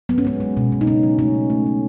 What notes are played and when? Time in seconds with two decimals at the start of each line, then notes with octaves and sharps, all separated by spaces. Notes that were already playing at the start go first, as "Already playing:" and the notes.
0.09 F#3 B3
0.18 C#4
0.25 G#3 B3
0.40 G#3
0.57 B2
0.72 B2
0.81 D#4
0.87 C#3 C#4
1.03 F#3
1.19 A3 C#4
1.34 B2
1.50 A3
1.66 A3